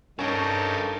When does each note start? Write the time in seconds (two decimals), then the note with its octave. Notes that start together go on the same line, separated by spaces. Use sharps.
0.19 G2 C#4 D#4 A4 A#4 A5